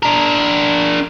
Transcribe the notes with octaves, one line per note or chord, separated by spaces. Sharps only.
D4 A#4